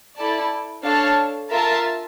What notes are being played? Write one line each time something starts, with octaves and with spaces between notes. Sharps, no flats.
E4 A4 D5 A5
D4 A4 C#5 F5 A5
F4 A#4 E5 A5